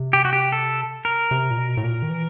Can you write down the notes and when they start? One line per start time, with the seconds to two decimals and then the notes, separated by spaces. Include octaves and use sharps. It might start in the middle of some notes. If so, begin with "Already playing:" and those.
Already playing: C3
0.13 G4
0.25 F#4
0.33 G4
0.52 A4
1.05 A#4
1.31 C3
1.51 A#2
1.57 B2
1.77 A2
1.84 A#2
2.02 D#3
2.10 E3